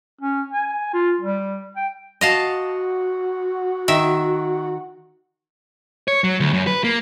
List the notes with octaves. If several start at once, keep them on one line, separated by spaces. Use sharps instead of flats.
C#4
G#5
F4
G3
G5
F#4 D#5 F5 A5
D#3 E5
C#5
F#3
D2
F#2
B4
A#3